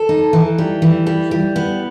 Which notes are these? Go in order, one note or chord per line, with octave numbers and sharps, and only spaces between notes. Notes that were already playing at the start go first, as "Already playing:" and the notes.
Already playing: A4
D#4
E3
G3
E3
G3
G3
B3